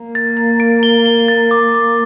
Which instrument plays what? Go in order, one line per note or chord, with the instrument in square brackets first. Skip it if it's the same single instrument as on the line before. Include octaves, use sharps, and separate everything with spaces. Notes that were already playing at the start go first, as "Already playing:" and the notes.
Already playing: [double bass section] A#3
[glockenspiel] A6
A6
D7
G7
G7
A6
D6
D6